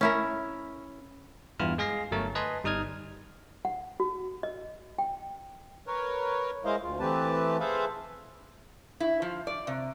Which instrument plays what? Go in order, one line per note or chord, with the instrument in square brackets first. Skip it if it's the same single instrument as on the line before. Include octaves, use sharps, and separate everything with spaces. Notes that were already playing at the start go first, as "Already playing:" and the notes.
[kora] C#4 E4 A#4
[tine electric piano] E2 G2 B3 E4 F4 F6
G#3 G#4 F5 A#6 C7
G1 F#3 A3 A#4 C#5 A5
B4 D#5 G#5 A5 B5 C6
G1 G3 D#4 D#6 F6 G#6
[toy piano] F#5
F#4
D#5
G5
[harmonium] A#4 B4 C#5
G#3 E4 A#4 C5 D#5 F5
D2 F4
E3 A3 C4 G4 B4 A5
G#4 A4 B4 C5 E5 F5
[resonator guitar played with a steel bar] E4
F3
D5
C3